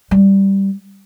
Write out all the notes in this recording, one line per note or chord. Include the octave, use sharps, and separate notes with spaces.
G3